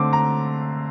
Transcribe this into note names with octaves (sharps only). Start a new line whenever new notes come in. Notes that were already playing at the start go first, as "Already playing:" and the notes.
Already playing: D3 A3 C4 D6
A#5